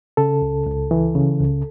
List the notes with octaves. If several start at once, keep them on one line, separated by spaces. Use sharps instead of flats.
C#3 A4
C#2
C#2
E3
C#3
C#2